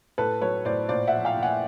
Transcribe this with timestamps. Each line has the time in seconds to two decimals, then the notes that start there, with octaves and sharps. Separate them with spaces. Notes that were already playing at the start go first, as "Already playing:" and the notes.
0.18 A2 A4 B4
0.41 F#3 B4 C#5
0.65 A2 C5 D5
0.89 A#2 C5 D5
1.07 E5 F#5
1.13 F3
1.25 F5 G5
1.37 A#2
1.43 F#5 G#5